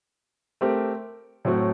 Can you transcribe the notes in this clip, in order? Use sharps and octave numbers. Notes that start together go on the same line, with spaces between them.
A3 C4 G4 A#4
A2 F#3 A3 C4 F#4